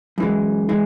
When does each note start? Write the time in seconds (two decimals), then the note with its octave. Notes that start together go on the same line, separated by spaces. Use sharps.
0.18 F#2 E3 G#3
0.69 E3 G#3